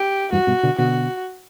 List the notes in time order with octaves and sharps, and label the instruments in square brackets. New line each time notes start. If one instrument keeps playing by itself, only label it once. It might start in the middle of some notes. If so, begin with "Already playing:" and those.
Already playing: [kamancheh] G4
[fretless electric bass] E2 G2 [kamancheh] F#4
[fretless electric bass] G2 B2
B2 D3
[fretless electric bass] B2 D3 [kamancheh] F#4